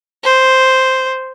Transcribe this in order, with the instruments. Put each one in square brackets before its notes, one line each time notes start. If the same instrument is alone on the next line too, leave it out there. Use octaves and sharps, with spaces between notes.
[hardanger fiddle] C5